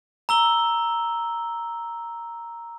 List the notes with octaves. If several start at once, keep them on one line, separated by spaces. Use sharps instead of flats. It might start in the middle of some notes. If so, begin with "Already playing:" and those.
A#5 E6 G7